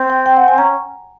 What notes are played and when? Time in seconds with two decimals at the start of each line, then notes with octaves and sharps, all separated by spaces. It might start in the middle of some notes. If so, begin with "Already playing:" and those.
Already playing: C4
0.10 G5
0.26 G5
0.37 F#5
0.48 G#5
0.58 C#4 A#5